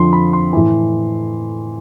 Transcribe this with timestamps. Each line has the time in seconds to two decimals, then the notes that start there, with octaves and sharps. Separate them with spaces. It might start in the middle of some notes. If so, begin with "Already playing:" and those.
Already playing: F2 D3 F3 C6
0.13 B5
0.33 C6
0.53 A2 E3